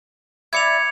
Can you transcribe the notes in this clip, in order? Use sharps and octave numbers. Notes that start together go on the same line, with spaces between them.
E4 D5 G#6 C#7 F7